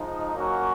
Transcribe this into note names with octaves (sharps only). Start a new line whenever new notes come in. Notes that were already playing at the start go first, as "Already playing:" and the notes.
Already playing: F3 G#3 D#4
F#3 A#3 C#4 F#4